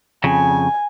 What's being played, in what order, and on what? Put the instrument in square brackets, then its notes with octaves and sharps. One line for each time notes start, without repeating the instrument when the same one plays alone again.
[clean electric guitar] F2 C#3 [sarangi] G#5